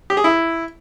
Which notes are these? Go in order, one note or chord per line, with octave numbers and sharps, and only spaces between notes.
G4
G#4
E4